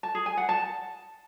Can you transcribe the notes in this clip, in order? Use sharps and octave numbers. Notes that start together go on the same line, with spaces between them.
A5
G#4
G#5
F#5
A5